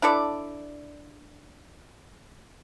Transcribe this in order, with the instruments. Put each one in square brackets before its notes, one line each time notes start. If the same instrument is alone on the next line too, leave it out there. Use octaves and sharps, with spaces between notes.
[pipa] D4 E4 A4 D5